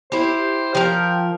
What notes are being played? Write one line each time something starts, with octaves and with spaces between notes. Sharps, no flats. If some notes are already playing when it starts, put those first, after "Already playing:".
E4 G4 C5
F3 A#4 G5